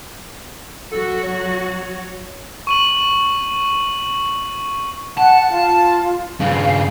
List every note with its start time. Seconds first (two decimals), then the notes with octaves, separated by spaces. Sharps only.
0.92 F#3 F#4 A4
1.23 C#5
2.67 C#6 D#7 F#7
5.18 F#5 A5
5.50 F4
6.40 G2 C#3 F5